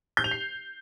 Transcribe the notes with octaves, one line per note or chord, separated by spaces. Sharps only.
G6
F7
C7